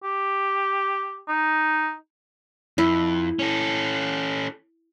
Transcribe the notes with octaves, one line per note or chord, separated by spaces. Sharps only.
G4
D#4
F2 E4
C#4 A4